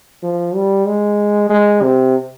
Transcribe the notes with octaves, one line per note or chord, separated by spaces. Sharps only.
F3
G3
G#3
G#3
C3